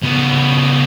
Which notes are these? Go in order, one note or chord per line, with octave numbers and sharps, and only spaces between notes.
C#3 B3